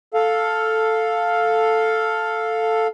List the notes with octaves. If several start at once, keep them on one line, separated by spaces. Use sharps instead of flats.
A4 F5